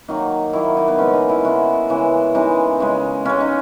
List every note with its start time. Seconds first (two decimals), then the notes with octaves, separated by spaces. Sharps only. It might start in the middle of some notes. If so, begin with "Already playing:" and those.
0.08 D#3 F#3 A#3 D#4
0.53 D#3 F#3 A#3 E4
0.77 D#4
0.88 B3
0.98 C#3 G#3 C#4
1.13 D#4
1.29 E4
1.45 C#3 G#3 F#4
1.89 C#3 E3 G#3
2.35 C#3 E3 G#3 D#4
2.80 C#3 G#3
3.25 C#3 G#3 C#4
3.40 D#4